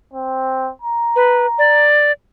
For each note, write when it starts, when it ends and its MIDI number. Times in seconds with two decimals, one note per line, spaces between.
0.13 0.70 60
0.82 1.86 82
1.16 1.46 71
1.58 2.12 74